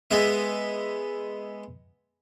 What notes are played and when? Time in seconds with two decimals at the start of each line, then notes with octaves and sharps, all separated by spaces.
0.11 G#3 B3 E5